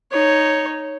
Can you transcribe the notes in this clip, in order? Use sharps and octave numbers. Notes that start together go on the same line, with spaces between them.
D#4 C#5